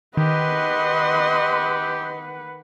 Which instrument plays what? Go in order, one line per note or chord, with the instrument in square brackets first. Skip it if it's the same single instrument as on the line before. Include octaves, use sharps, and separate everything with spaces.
[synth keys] D#3 [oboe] G4 [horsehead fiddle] B4 F#5 [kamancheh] D#5 C6